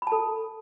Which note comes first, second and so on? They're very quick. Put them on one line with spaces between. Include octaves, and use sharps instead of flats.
B5 A5 A4